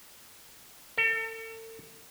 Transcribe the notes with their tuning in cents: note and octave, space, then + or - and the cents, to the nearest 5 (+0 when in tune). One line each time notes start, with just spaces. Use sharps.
A4 +40